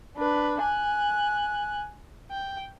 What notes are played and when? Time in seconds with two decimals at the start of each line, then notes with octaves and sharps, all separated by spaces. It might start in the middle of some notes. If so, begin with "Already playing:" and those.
0.17 D4 B4
0.61 G#5 F#6
2.31 G5